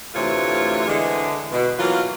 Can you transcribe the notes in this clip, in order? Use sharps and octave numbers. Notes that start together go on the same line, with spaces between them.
D2 C3 E3 A3 F4 C#5
D3 E3 G#3
B2
E3 F#3 A#3 B3 F4